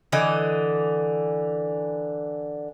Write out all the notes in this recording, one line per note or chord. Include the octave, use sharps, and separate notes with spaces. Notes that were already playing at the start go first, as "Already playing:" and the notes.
D3 E3 D#5